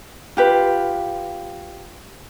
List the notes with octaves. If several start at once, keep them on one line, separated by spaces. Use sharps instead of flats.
F4 G4 B4